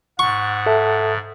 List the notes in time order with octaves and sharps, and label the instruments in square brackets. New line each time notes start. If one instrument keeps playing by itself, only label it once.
[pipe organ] G#2 [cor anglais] F#5 [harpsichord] C#6
[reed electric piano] A4 E5 A5